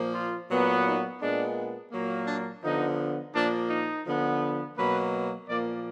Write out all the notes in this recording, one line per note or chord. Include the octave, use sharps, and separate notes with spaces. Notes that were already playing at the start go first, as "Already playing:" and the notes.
Already playing: A#2 F3 A#3
F4
A#2 F#3 B3
D#4
A#2 G#3 B3 D4
A#2 F#3 A#3
D4
D3 F3 B3 D#4
A#2 F3 A#3 D4
D#4
D3 F3 B3
B2 F#3 A#3 B4
A#2 F3 A#3 D5